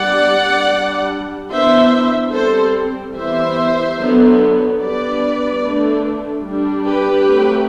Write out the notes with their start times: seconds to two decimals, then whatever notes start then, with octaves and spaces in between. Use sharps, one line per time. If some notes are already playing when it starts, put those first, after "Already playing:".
Already playing: G3 D4 D5 F#5
0.69 G3 D4
1.51 E3 B3 D4 C5 E5
2.33 G3 C4 A4 C5
3.15 E3 G3 B3 C5 E5
3.98 D3 F#3 B3
4.80 G3 B3 D4 B4 D5
5.62 D3 A3 D4
6.44 G3 D4
6.85 G4 B4
7.26 F#3 A3 C4